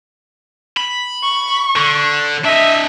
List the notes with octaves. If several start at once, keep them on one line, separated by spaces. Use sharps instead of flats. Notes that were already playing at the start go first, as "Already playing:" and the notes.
B5
C#6
D3
D4 D#5 E5